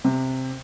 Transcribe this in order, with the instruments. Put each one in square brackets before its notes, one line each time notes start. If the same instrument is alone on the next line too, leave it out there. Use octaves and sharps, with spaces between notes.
[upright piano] C3